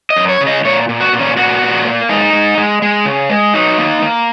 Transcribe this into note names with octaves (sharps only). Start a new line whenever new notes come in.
D#5
F#2
C#5
C#3
D#5
A#2 C#5
A#2
F#4
A#2
C#4
A#2 F#4
A#2
A#3
G#3 D#4
G#3
G#3
G#3
C#3
G#3
F#3 D#4
A#3
A#3